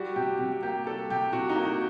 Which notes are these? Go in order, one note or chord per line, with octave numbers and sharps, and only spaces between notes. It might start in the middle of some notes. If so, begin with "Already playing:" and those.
Already playing: G3 F#4
C3 G4
C3 G4
A#3 G4
G3 A4
C3 G4
C3 F#4
D#4
A#3
F#4